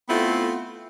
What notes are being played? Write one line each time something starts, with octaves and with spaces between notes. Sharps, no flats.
A3 B3 C4 E4 F4 A4